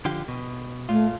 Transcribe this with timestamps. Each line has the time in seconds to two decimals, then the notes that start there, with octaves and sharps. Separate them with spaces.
0.05 D3 F3 G4
0.28 B2
0.89 A#2 A3 F4